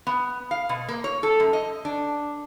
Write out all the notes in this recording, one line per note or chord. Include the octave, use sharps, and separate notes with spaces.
B3
F5
B2
A#3
C#5
A4
F#2
D#5
D4